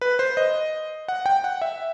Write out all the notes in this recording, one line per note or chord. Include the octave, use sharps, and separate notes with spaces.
B4
C5
D#5
F#5
G5
F#5
E5